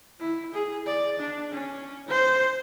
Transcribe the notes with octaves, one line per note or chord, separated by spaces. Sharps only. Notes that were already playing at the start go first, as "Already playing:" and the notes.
E4
G#4
D5
D4
C#4
C5